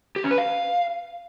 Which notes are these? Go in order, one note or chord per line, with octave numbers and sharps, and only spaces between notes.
G4
C#4
B4
F5